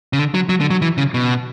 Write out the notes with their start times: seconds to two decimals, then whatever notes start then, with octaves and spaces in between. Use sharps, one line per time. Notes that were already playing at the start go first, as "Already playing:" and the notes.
0.13 C#3
0.18 D3
0.34 F#3
0.49 F#3
0.60 D3
0.70 F#3
0.82 E3
0.98 C#3
1.14 B2